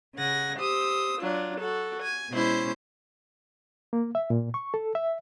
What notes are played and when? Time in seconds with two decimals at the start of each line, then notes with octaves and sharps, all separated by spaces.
0.15 C#3 F#5 G#5 A#6
0.56 G4 C5 D#6 E6
1.19 F#3 D4 F4
1.59 F#4 A4
2.01 G#5
2.32 B2 G#3 C#4 E4 C5 G6
3.93 A#3
4.15 E5
4.30 A#2
4.54 C#6
4.74 A4
4.95 E5